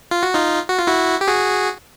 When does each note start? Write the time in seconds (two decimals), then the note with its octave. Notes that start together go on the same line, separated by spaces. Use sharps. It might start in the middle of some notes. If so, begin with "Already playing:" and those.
0.11 F4
0.23 F#4
0.34 D#4 F4
0.69 F#4
0.78 F4
0.87 E4 F#4
1.21 G4
1.27 F#4 G#4